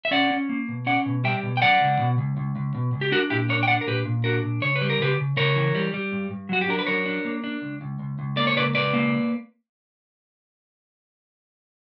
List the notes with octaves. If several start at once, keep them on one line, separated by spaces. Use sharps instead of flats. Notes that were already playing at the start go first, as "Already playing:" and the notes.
E5
C#4 D5 F#5
C#4
A#3
B2
C#4 D5 F#5
B2
G3 E5 G5
B2
G5
F#3 D5 F#5
C#2
B2
C#2
C#2
C#2
B2
C#2
G4
D4 F#4 A#4
A#2 E4 G4
D4 A#4 C#5
G5
D4 D5 F#5
A#4
A#2 G4 B4
A#2
D4 F#4 A#4
A#2
C#3 C#5
B4
G3
A#4
C#3 G4 B4
C#3
C#3 A#4 C#5
E3
G3
G3
G2
G2
F#3 F#4
G4
D4 A#4
B4
F#3 A#4 C#5
D4
A#3
D4
C#2
C#2
C#2
C#2
A#3 D5
C#5
C#2 B4 D5
C#2 B4 D5
A#3